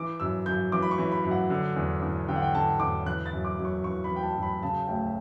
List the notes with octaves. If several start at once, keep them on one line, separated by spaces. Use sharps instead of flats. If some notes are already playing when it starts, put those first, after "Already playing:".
Already playing: E3 D6
F#2 E6
F#2 G6
E3 D6
B5
C#6
E3
B5
F#2
F#5
D3
E2
E2
D3 G5
F#5
G5
D3 A5
E2 D6
E3 F#6
A6
F#2
D6
F#2
C#6
E3 C#6
B5
E3
G5
A5
F#2
B5
C#3 A5
D2 G5